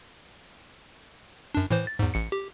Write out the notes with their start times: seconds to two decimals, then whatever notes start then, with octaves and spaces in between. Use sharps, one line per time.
1.55 F#2 D4
1.71 A2 E3 C5
1.87 A6
1.99 E2 G#2
2.14 A1 C#7
2.32 G4